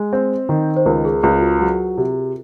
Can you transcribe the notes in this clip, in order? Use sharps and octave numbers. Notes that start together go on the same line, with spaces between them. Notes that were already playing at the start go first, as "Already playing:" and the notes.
Already playing: G#3
C4
D#3
C5
C#2 A#4
G#4
C#2 F4
F#4
F#3
C3